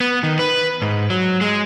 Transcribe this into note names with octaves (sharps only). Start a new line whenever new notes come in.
B3
D#3
B4
G#2
F#3
G#3